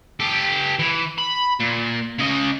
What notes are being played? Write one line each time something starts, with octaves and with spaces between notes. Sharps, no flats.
G4 A4
E3
B5
A#2
C#3 D#5